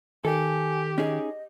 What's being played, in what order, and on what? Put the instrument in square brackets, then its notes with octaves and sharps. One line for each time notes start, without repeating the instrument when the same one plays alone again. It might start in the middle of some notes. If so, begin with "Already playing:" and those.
[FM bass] D#3 [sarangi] G4 [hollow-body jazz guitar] A4 [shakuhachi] G#5
[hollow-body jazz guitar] C#4 D#4 G#4 [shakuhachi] D#5